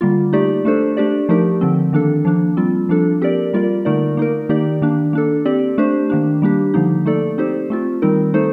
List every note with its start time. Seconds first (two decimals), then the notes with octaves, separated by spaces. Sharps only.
0.01 D3 G3 A#3 F4
0.33 A3 D#4 G4 D5
0.65 A3 D4 A4 C5
0.97 A3 D4 G4 D5
1.29 F3 A3 D#4 G4 A#4
1.61 D3 F3 C4
1.93 D#3 A#3 D4 A4
2.25 F3 A#3 D4
2.57 G3 C4 F4
2.89 F3 A#3 D4 A4
3.21 C4 G4 A#4 D5
3.53 G3 A#3 F4 A#4 D5
3.85 D3 A3 D#4 A#4 D5
4.17 A#3 D#4 A#4
4.49 D#3 A#3 D#4 G4 D5
4.82 D#3 A#3 D4
5.13 A#3 D4 A4
5.45 C4 G4 D5
5.78 A3 D4 G4 C5
6.10 D#3 A#3 D4
6.42 G3 A#3 D4 G4
6.74 D3 F3 A#3 D#4
7.06 A3 D#4 A4 D5
7.38 C4 D#4 G4 C5
7.70 A3 C4 F4
8.02 D#3 G3 C4 D#4 A#4
8.34 A3 D#4 A4 C5